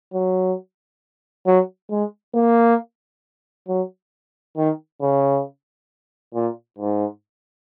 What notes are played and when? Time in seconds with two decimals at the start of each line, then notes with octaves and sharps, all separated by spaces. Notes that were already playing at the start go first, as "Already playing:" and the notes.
0.13 F#3
1.46 F#3
1.90 G#3
2.35 A#3
3.68 F#3
4.57 D#3
5.01 C#3
6.34 A#2
6.79 G#2